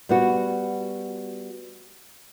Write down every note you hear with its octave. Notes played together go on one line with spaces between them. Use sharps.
G3 B3 F#4